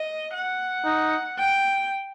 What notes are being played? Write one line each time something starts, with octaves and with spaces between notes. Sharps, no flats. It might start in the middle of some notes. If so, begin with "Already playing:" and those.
Already playing: D#5
F#5
D#4
G5